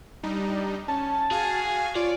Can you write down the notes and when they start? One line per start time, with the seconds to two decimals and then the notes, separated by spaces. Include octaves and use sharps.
0.23 G3 D4 D#4
0.88 C#4 A5
1.31 F#4 G#4 F5 G#5
1.95 F4 C#5 D5